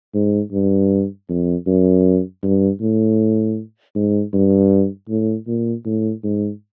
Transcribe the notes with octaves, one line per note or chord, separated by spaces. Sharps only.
G#2
G2
F2
F#2
G2
A2
G#2
G2
A2
A#2
A2
G#2